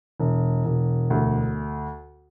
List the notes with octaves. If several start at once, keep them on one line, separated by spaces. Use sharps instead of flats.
E1
E1
D2